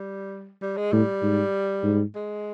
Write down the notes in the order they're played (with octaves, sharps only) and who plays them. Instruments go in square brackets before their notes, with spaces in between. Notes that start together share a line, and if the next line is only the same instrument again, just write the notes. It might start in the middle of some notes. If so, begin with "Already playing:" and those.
Already playing: [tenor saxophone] G3
G3
G#3
[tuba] A2 [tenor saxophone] G3
[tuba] G#2
G#2
[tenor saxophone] G#3